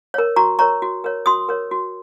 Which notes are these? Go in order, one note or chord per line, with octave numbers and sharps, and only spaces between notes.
A#4 C#5
F#4 A#5 C#6
A#4 C#5 A#5 C#6
F#4
A#4 C#5
F#4 C6 D#6
A#4 C#5
F#4